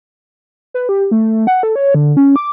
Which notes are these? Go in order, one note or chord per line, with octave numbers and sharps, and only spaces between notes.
B4
G4
A3
F#5
A4
C#5
D3
C#4
D6